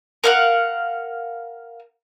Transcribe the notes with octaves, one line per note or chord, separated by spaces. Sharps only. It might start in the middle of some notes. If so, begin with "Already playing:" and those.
A#4 F5 F#5